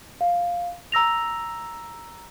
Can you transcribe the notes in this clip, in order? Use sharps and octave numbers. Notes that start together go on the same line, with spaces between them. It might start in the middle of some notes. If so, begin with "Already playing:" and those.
F5
A#5 E6 A#6 F7